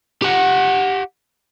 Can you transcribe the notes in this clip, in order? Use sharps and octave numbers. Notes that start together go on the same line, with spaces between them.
G4 F#5